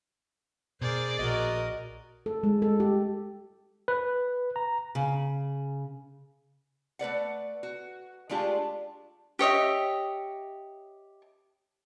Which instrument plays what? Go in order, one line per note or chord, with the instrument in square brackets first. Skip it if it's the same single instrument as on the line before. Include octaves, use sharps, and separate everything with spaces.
[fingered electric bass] B2 [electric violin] G#4 D5 [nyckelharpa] A#4 C5
[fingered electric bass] A#1 [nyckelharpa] F#4 A#4 [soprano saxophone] D#5
[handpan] A4
G#3
A4
G4
[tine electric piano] B4
A#5
[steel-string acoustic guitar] C#3
[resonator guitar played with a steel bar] A3 B4 D5 F#5
F#4
G#3 A3 D4 F4 G4
[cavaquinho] G4 C#5 D#5 E5